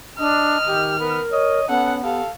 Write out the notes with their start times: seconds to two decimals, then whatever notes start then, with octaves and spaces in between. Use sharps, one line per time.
0.19 D4 D#5 F6
0.67 D#3 G4
1.00 B3 A#4
1.32 C#5 D#5
1.69 B3 C#4 A4 F#5
2.04 G4 A4 F5